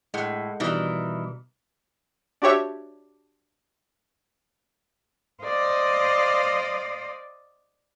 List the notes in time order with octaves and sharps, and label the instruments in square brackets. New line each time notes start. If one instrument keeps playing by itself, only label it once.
[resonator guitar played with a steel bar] A2 [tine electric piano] G#3 F#5 G6
[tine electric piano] B2 G3 [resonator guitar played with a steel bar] D#3 E3
[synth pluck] D4 F#4 G4 C#5 E5
[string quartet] C5 D5 D#5 F5